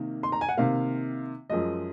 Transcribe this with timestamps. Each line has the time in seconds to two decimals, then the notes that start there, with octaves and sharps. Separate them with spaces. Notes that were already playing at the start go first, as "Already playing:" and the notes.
Already playing: C3 D#3 A#3
0.23 C6
0.32 A#5
0.41 G#5
0.49 F#5
0.57 C3 D#3 A#3 F5
1.49 F#2 F3 G#3 D#5